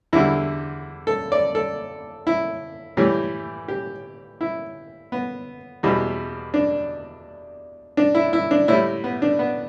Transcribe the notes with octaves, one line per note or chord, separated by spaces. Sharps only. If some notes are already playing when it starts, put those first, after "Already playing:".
E2 D3 G3 E4
A4
D5
A4
E4
A2 E3 G3 G4
G4
E4
B3
E2 B2 G3
D4
D4
E4
E4
D4
A2 G3 E4
B3
D4
B3